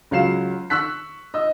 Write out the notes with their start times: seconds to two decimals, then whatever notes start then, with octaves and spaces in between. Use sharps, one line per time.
0.11 C#2 F#3 F5 C7 E7
0.70 C#6 E6 F#6 B6
1.34 D#5 E6